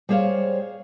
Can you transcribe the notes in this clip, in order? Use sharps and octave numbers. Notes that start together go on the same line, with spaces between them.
G3 G#4 C5 C#5 F5